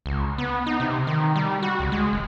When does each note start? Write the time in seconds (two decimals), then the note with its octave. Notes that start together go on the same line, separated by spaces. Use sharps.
0.06 C#2
0.38 B3
0.67 D#4
0.80 C3
1.07 D#3
1.36 G3
1.63 F#4
1.80 C#2
1.92 G#3
2.13 D#1